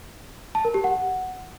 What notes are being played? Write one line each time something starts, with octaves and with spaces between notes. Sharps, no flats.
A5
A#4
G4
F#5